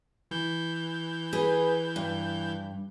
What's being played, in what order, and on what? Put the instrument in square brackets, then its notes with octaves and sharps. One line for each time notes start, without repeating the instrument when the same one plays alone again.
[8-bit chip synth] E3 G6
[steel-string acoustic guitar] G#4 B4
G2